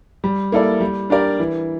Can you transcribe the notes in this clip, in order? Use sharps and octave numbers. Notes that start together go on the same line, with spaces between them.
G3
A#3 E4 A4 D5
G3
D4 G4 A#4 D5
E3